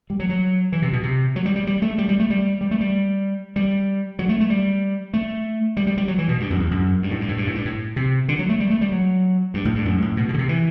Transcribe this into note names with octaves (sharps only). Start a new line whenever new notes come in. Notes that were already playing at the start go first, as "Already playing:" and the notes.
G3
F#3
F#3
E3
C3
B2
C3
F#3
G3
G3
G3
A3
G3
G3
A3
G3
G3
A3
G3
G3
F#3
A3
A3
G3
A3
G3
G3
G3
F#3
E3
B2
G2
F#2
E2
F#2
G2
A2
G2
A2
G2
A2
G2
A2
C3
D3
F#3
A3
G3
A3
G3
F#3
G2
A2
G2
F#2
A2
B2
B2
D3
C3
E3